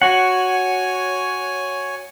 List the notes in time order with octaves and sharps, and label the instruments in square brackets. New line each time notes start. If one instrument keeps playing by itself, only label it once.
[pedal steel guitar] F#4 F#5 [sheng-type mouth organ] C#5 G#5